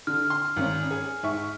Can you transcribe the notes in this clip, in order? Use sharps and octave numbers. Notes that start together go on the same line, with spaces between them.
D3 F6
C6
G#1 C#4
G#4
G#2 E5 C#6